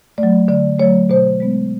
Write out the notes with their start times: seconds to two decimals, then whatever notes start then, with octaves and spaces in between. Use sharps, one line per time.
0.18 A3 D5
0.23 F#3
0.48 D3 D5
0.79 F#3 A3 C#5
1.09 B2 C5
1.40 G#3 B3